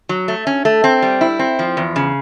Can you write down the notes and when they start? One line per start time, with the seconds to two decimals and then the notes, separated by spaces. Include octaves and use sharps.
0.09 F#3
0.28 A3
0.47 C#4
0.65 A3
0.84 C4
1.02 G3
1.21 E4
1.39 C4
1.59 F3
1.77 E2
1.96 C#3